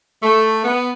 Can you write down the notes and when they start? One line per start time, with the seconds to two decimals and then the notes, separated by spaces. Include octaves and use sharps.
0.23 A3
0.64 B3